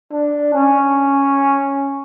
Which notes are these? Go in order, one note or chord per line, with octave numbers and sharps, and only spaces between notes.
D4
C#4